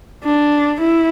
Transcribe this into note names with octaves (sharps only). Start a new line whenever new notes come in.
D4
E4